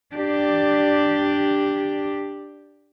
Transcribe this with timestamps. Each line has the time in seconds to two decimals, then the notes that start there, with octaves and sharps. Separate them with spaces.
0.15 D4 G4